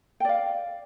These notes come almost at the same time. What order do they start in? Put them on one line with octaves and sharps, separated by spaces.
G5 D5 F5